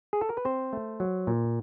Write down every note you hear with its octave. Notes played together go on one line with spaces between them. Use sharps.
G#4
A4
A#4
B4
C4 C5
A3
F#3
A#2